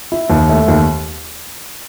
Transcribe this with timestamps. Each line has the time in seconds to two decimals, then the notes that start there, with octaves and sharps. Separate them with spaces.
0.12 E4
0.30 D#2
0.49 A3
0.68 D#2